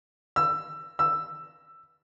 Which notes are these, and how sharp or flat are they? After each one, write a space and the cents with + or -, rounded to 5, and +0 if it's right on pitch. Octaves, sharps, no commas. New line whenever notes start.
E6 +20
E6 +10